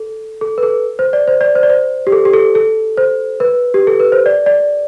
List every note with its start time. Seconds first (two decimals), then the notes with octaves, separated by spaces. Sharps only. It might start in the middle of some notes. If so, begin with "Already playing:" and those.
Already playing: A4
0.41 A4
0.58 B4
0.63 A4
0.99 C5
1.13 D5
1.28 C5
1.41 D5
1.55 C5
1.63 D5
1.70 C5
2.07 G4
2.12 A4
2.25 G4
2.33 A4
2.55 A4
2.97 C5
3.40 B4
3.74 G4
3.87 A4
4.00 B4
4.12 C5
4.26 D5
4.46 D5